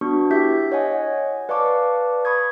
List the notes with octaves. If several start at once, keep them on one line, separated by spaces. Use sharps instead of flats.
B3 D4 F#4 C#6
E4 G4 E5 G6 B6
C#5 D#5 F#5 G#5
B4 D5 F5 A5 C#6 D6
B5 C#6 D#6 G#6